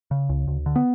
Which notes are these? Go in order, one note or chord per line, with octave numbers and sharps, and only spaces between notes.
C#3
C#2
D2
D3
B3